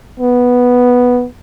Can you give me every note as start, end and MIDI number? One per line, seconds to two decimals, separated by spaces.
0.20 1.26 59